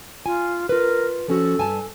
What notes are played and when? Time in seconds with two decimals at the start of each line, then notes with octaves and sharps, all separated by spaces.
0.26 F4 G#5
0.69 F4 A#4 B4
1.28 F3 C#4 F#4 A4
1.58 G2 G#5 A5